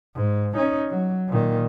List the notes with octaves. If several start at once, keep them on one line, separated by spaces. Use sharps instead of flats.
G#2
C#4 D#4
F#3
A#2 D#3